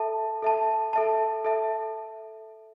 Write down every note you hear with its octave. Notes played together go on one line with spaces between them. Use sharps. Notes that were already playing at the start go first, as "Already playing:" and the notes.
Already playing: A4 E5 A5
A4 E5 A5
A4 E5 A5
A4 E5 A5